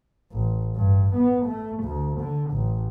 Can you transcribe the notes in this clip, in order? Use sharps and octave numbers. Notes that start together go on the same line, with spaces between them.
A1
G2
B3
A3
D2
D3
A1